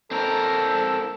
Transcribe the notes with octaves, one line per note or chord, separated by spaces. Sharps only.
C4 A4 A#4